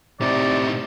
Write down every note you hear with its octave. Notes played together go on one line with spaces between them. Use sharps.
A2 C3 D#4 D5